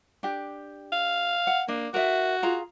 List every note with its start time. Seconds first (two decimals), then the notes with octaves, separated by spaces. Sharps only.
0.23 D4 G4
0.92 F5
1.47 F#5
1.68 A#3 D4
1.94 F#4 A#4 E5
2.43 F4 G#4 A#5